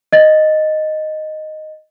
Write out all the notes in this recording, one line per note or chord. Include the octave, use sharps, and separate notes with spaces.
D#5 A6